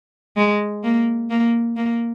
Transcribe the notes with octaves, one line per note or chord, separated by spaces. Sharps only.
G#3
A#3
A#3
A#3